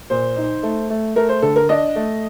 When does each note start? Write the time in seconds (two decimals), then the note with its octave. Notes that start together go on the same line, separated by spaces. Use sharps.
0.10 A#2 C5
0.36 D#4
0.63 A3
0.90 A3
1.16 A3 A#4
1.29 C5
1.42 D3 A4
1.56 A#4
1.69 D4 D#5
1.96 A3